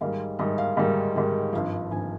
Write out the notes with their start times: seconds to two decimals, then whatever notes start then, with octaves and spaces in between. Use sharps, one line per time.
0.01 G#2 D#3 G3 F5
0.39 G#2 D#3 G3 D#5
0.58 F5
0.77 G#2 D#3 G3
1.16 G#2 D#3 G3
1.53 G#1 G2 F3 F5
1.91 G#1 G2 F3 G#5